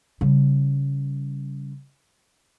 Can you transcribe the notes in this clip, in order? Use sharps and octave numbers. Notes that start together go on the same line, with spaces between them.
C#3 G3